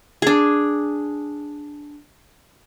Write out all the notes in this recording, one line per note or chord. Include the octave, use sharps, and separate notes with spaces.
D4 G#4